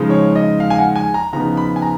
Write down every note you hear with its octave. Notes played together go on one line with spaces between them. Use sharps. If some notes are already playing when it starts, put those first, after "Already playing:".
Already playing: C#3 F3 G#3 D#4
C#5
D#5
F5
G#5
F#5
G#5
A#5
C#3 F3 B3 D#4 A#5
B5
G#5
A#5